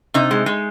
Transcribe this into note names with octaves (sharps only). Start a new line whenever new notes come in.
C3 D#4
G#3
G#3